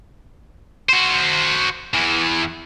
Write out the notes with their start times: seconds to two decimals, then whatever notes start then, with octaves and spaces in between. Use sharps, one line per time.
0.89 F#4 C5
1.94 E2 E3